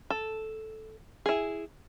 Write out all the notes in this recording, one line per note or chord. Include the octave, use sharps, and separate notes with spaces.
A4
E4 G#4